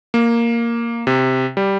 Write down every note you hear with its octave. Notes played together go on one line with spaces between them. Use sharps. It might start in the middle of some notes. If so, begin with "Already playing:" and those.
A#3
C3
G3